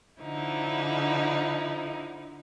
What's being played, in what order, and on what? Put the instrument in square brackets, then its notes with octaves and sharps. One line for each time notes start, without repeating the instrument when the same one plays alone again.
[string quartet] D3 F3 D#4 E4